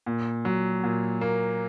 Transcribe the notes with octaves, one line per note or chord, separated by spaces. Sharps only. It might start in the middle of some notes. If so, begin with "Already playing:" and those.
A#2
F#3
A#2
A#3